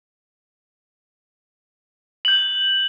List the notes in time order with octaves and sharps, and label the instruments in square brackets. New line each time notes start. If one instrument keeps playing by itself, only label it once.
[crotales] G6 F#7